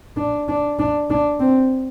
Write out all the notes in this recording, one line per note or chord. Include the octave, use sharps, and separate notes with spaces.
D4
D4
D4
D4
C4